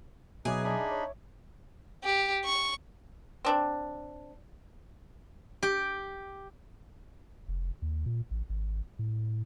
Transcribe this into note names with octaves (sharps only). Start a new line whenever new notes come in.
B2 F#3 D#4 G#4 B4 E5 D6 D#6
D4 D#4 D5 B5
C#5
G4
C#6
C4 D4
G4
F1
D#2
A#2
A1
G#1
A2